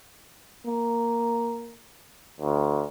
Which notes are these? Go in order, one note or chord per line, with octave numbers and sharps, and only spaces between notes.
A#3
D2